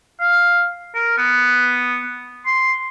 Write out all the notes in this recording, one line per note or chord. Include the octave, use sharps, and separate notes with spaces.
F5
A#4
B3
C6